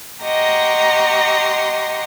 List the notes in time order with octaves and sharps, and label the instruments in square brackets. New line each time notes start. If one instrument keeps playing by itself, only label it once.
[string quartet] G4 D#5 F#5 A#5 C6 C#6